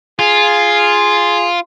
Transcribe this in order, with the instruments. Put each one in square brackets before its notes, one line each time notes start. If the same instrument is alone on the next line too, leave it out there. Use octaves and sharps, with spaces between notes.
[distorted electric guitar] F4 [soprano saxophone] G#4